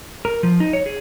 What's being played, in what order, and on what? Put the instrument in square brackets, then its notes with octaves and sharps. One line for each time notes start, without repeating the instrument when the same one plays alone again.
[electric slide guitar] A#4
F3
D#4
C#5
G#4